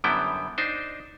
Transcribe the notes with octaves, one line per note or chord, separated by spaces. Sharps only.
F#2 D3 G3 B3 E4 G5
D4 D#4 C5